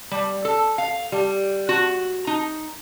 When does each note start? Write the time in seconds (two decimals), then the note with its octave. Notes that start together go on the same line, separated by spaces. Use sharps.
0.11 G3
0.45 A4
0.78 F5
1.12 G3
1.69 F#4
2.27 D#4